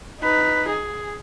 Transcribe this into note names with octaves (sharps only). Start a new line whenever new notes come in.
D#4 B4
G#4